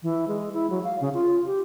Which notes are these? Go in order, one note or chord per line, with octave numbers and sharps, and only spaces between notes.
E3
G#3
E4
F#3
F5
C#3
F4
G4